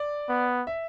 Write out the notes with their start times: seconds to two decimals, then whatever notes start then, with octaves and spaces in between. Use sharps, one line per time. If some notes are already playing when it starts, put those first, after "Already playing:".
Already playing: D5
0.29 B3
0.67 E5